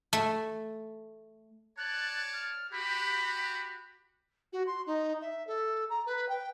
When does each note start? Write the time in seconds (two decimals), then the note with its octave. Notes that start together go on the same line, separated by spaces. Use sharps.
0.13 A3
1.78 C#5 D5 A5 F#6
2.33 F6
2.72 F#4 G4 B5
4.52 F#4
4.67 C6
4.86 D#4
5.21 E5
5.47 A4
5.89 A#5
6.06 B4
6.28 G5